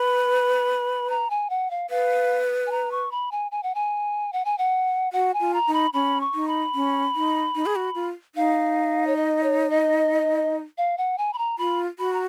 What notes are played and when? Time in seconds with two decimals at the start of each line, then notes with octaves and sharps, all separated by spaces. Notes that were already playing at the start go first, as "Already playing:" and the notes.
Already playing: B4 B5
1.10 A#5
1.30 G#5
1.50 F#5
1.71 F5
1.90 B4 F5
2.67 G#5
2.71 A#5
2.91 C#6
3.11 B5
3.32 G#5
3.52 G#5
3.63 F#5
3.75 G#5
4.33 F#5
4.45 G#5
4.58 F#5
5.13 F#4 F#5
5.34 G#5
5.40 F4
5.54 A#5
5.68 D#4
5.73 B5
5.94 C#4 B5
6.21 C#6
6.34 D#4
6.48 B5
6.75 C#4
7.15 D#4
7.55 D#4
7.66 G#4
7.76 F#4
7.95 F4
8.35 D#4 F5
9.07 C#5
9.16 D#5
9.43 C#5
9.70 D#5
10.78 F5
10.98 F#5
11.18 G#5
11.33 B5
11.38 A#5
11.58 F4 B5
11.99 F#4 B5
12.13 A#5